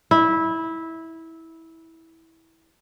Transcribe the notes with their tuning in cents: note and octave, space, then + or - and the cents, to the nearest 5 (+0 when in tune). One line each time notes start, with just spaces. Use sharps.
E4 -15